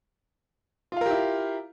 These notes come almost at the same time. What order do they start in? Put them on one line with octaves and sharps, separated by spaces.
F4 F5 A#4 G4 E4